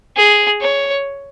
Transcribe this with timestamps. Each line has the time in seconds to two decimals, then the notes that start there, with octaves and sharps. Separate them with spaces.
0.16 G#4
0.61 C#5